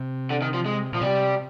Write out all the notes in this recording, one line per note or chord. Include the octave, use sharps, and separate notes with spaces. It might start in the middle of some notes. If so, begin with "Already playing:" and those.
Already playing: C3
D3
D#3
F3
G#3
A#2 F3
C3 G3